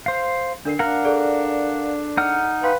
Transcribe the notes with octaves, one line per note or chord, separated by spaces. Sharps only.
C5 F5
D3 D4 A#4 C7
D4 A#4 F5 F#5 A#5
G#4 A4 D5
D#4 F#5 F6
B4 F5 G5 C6